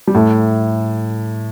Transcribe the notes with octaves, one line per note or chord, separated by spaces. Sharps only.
G3
A2 A3